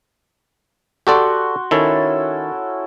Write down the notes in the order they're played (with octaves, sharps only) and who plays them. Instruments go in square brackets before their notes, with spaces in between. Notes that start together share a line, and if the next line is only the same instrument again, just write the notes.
[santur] F#4 C6 [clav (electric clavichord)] G4 A4 D5
[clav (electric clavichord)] D#3 [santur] C#4 E4 A4